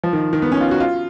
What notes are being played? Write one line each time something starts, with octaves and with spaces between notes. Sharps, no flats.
F3
D#3
D#3
B3
C#4
F4
F#4
F4